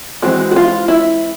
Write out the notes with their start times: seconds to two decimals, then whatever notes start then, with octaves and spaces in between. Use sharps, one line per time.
0.22 E3 G#3 C4 F#4
0.51 F#4
0.56 F4
0.88 E4